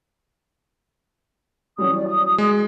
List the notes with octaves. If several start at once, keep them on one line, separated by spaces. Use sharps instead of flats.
E3 F#3 G3 C#4 D#6
D5
D#6
G#3